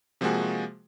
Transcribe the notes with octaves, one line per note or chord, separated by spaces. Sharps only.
C3 F3 G#3 A#3 F#4 G#4